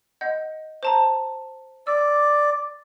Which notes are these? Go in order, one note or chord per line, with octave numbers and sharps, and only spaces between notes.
D#5 F#5 G6
C5 A5 A#5
D5 E6